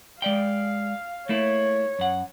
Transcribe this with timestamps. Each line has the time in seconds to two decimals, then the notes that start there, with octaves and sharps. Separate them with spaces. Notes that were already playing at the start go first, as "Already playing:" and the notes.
0.22 G#3 D5 F5 G5
1.29 A3 A#3 E4 C#5
1.99 F#2 F#5